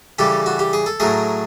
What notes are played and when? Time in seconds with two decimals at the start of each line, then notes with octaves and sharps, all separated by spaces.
0.19 C#3 E3 G3 G4 A4
0.46 F#4
0.59 G4
0.73 G#4
0.86 A4
1.00 A2 F#3 A3 G#4 A#4